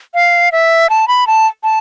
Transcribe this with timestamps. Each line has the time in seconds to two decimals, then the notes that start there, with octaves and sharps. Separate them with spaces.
0.14 F5
0.52 E5
0.90 A5
1.08 B5
1.27 A5
1.63 A5